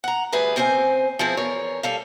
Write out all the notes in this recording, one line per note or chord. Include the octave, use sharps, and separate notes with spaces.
F#5 A#5
D2 G3 G#4 B4 E5 G#5
C#3 C4 C5 F#5 G#5
F3 B3 C4 E4 G#4
E2 A#4 C#5
G3 A4 F5